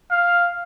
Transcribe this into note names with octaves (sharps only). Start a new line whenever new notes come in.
F5